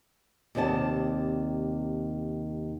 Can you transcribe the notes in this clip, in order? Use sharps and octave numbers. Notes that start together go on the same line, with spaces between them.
D#2 C3 C5 D5 A5